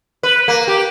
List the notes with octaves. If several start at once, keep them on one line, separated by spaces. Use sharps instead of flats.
B4
A#3
G4